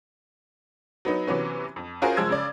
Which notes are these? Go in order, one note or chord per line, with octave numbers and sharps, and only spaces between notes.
F#3 B3 D#4
C3 E3 F#3 B3 C#4
F2
C#4 F4 F#4 G#4 A#4 C5
F#1 F3 G#3 E6 G#6
C#3 D5